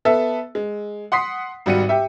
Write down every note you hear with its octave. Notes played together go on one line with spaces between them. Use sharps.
B3 A4 E5
G#3
F#5 C6 D#6 B6 C7
G#1 G3 F#4 C#7 D#7
G4 E5